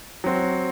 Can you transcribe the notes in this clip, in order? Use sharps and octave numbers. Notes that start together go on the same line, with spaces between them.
F#3 C4 F#4